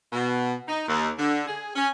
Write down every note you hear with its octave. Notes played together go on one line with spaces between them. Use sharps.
B2
D#4
D#2
D3
G#4
C#4